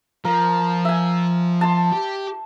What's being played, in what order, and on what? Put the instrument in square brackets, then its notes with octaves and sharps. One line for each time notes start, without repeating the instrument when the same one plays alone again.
[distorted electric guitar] F3 [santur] A#4
[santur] E5 G#5
A5 C6
[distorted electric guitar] G4